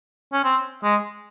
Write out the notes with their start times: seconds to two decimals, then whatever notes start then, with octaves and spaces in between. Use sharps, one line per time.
0.33 C#4
0.44 C4
0.83 G#3